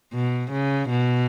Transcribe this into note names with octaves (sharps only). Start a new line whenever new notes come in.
B2
C#3
B2